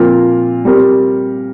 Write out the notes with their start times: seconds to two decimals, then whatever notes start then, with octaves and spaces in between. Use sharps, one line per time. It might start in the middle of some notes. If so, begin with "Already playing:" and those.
Already playing: A#2 F3 C4 F4 A#4
0.65 G3 C4 G4 A#4